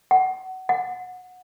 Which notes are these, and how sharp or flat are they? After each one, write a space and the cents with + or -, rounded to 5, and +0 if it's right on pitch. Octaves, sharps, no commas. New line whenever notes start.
F#5 +20
F#5 -20